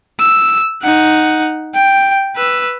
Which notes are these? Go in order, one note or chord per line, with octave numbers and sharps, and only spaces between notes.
E6
D#4 F#5
G5
B4 E6